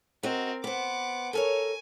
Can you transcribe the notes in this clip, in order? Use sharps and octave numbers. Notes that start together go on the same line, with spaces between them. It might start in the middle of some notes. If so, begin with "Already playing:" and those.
C4 F#4 A#4 D#5
B3 C5 F#5 D6
A4 A#4 C#5 G#5